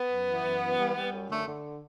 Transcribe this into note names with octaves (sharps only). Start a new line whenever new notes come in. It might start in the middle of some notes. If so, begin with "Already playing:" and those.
Already playing: B3
F#2
E3
F#2
E3
G3
G3
F#2
D3 A3
D3